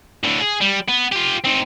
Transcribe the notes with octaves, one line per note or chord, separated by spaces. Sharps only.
A2 D3
G#4
G3
B3
F4 G4
C4 D#4